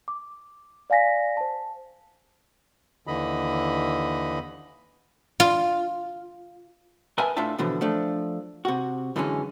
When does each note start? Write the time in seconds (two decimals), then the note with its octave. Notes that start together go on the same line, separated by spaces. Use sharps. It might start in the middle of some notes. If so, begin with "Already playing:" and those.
0.08 D6
0.90 D5 F5 G#5 A#6 B6
1.37 C5 A5
3.07 D#2 D3 E3 D#5 B5
5.40 F4
7.18 A#4 B4 D#5 E5 G#5 A5
7.37 A2 D4 F4 E5 A5
7.58 B2 D3 E3 F3
7.81 F3 A3 D4
8.65 C3 F#4
9.16 F#2 D3 E3 G#3 C4 C#4